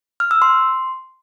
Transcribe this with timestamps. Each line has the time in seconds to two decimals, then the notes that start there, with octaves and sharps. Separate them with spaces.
0.20 F6
0.31 E6
0.42 C6